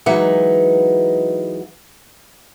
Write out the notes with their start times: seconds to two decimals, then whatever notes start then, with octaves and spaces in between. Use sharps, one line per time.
0.06 E3 F#3 G#3 D#4 B4 F#5